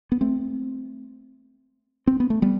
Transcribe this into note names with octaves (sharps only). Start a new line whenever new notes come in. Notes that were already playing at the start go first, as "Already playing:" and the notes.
B3
A3 C4
C4
B3
A3
G3 B3